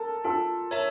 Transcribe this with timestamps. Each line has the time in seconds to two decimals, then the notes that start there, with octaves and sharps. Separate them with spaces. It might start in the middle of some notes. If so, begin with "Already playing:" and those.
Already playing: A4 A#4
0.24 F4 A4
0.71 A#4 C#5 E5 A5